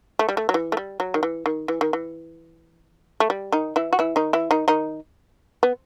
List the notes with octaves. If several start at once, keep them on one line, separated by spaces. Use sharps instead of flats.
A3
G3
A3
F#3
E3
A3
G3
F#3
D#3
E3
D#3
E3
D#3
E3
A3
G3
D#3 D#4
E3 E4
F#4
E3 E4
D#3 D#4
E3 E4
D#3 D#4
D#3 D#4
B3